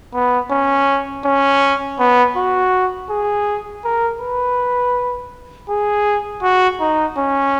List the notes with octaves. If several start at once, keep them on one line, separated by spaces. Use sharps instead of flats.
B3
C#4
C#4
B3
F#4
G#4
A#4
B4
G#4
F#4
D#4
C#4